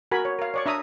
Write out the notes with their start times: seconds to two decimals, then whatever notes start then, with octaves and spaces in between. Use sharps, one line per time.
0.12 F#4 A#4 G#5 B5
0.25 C#5
0.39 A#4 F5
0.54 C#5 D5 C#6
0.66 D4 E5 A#5 D#6